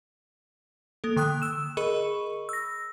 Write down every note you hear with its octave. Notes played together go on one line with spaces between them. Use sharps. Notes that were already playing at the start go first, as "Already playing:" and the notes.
A#3 A4
D3 G5 D#6 F#6
E6 E7
G#4 A#4 D#5 B5 C#6
E6 A#6